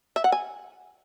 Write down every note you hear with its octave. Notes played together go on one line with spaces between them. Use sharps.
E5
F#5
G#5